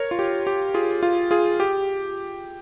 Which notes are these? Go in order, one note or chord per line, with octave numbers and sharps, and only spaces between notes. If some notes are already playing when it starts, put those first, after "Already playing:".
Already playing: A#4 C#5
F4
G4
G4
F4 G#4
F4
F4 G#4
G4